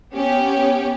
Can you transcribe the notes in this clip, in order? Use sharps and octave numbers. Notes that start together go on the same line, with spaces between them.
B3 C#4 G4